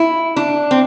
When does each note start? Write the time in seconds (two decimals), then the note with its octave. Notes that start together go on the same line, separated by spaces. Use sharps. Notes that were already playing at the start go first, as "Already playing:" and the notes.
Already playing: E4
0.36 D4
0.71 C4